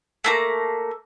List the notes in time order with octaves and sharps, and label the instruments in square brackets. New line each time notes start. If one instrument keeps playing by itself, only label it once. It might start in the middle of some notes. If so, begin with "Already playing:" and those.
[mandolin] A3 A#3 A#5